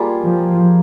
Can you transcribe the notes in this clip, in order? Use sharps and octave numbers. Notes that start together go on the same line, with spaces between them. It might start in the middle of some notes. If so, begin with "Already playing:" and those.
Already playing: G3 A#3 F4 G#4
F3